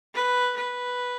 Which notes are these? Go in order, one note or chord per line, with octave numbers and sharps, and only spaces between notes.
B4
B4